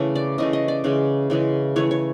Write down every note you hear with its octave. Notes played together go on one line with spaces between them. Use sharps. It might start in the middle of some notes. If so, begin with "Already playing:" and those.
Already playing: C#3 E3 A3
D5
C#3 E3 A3 D#5
D#5
D5
C#3 E3 G#3
C#3 E3 G#3
E3 A3 C#5
C#5